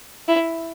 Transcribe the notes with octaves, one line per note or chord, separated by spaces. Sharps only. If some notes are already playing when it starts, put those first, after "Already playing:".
E4